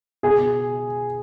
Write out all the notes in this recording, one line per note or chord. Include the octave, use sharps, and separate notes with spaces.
B2 G#4 G#5